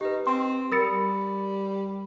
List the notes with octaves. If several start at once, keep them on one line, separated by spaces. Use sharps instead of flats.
D#4 G4 B4
C4 G5 C6
G3 A#4 B5 D#6 A6 C#7